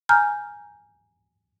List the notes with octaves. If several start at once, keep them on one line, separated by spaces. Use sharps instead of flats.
G#5 A#5 F6 G6